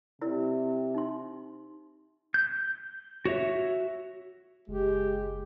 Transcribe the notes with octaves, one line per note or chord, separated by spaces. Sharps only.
C3 E4 A#4 D5
D#4 C6
G6
F#4 C#5 E5
F#1 G#3 G4